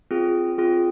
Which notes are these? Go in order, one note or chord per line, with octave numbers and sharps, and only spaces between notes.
C4 F4 G#4
C4 F4 G#4